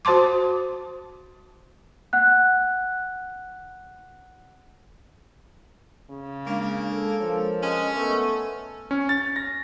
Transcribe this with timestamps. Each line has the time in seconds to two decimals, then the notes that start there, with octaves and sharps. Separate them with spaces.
0.05 F#4 C5 A5 C6 D6
2.13 F#5 F#6
6.10 C#3
6.46 G#3 A#3 D4 F5
6.91 A4
7.20 F3 A#4 C#5
7.63 G#3 C#4
7.96 A3 B3
8.91 C#4
9.09 A6
9.36 A#6